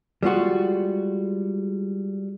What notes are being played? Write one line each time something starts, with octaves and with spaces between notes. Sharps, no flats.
G3 G#3 F4 F#4